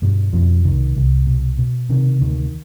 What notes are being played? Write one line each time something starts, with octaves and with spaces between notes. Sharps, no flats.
G2 B2 G3
F2 B2 F3
C2 D#3
C2
B2
B2
C3 D#3
D2 D#3